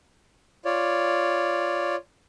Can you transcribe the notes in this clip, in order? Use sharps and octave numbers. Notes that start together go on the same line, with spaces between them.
F4 C#5 D5